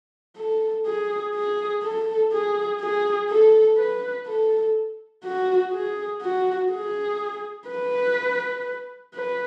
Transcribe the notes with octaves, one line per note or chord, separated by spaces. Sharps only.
A4
G#4
G#4
A4
G#4
G#4
A4
B4
A4
F#4
G#4
F#4
G#4
B4
B4